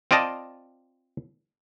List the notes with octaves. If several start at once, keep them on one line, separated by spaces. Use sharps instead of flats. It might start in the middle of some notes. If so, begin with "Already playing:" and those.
C4 F4 D5 D#5 A5